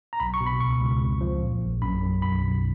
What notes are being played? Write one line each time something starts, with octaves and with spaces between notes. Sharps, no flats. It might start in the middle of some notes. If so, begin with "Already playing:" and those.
A#5
B1 B5
C#6
B2
B5
C#2 C#6
C#2
F2
F3
A#2
A#1
F#2 B5
F#2
B1 B5
B1